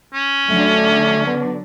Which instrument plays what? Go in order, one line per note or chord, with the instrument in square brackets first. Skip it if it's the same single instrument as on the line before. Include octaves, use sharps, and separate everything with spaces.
[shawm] C#4
[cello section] D3 F#3 D4 [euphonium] A3
[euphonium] B3